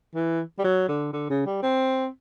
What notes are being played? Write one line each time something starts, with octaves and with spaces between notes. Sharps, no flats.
E3
G3
F#3
D3
D3
C#3
G3
C4